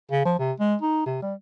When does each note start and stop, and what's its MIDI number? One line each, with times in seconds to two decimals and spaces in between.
0.11 0.24 49
0.25 0.35 53
0.39 0.52 48
0.60 0.75 56
0.82 1.06 63
1.06 1.21 48
1.22 1.34 55